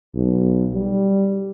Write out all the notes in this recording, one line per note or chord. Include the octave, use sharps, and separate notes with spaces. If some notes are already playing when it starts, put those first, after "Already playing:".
B1
G3